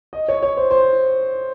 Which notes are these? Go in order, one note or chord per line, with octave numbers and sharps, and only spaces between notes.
D#5
C#5
C#5
C5
C5